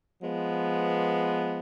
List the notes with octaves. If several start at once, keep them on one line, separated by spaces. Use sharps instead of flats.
F3 G#3 B3